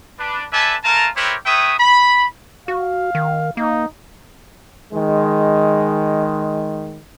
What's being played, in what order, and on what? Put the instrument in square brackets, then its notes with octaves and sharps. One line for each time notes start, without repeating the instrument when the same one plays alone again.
[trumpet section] D4 B4
A4 B4 D5 E5 G#5 A5
A3 F4 A#4 A5 A#5
C4 E4 G4 A#4 B4 C#5
A3 B4 C#5 E5 G5 D#6
B5
[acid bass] F#4 [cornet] F5
[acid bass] D#3
[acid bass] A#3 [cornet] D#4
[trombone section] D#3 G#3